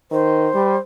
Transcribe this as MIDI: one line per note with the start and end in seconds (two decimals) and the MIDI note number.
0.11 0.49 51
0.11 0.78 72
0.55 0.76 55